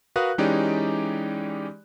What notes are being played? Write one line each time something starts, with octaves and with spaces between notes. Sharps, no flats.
F#4 A#4 B4 F5 D#6 F#6
E3 G#3 C#4 D#4 G4 D5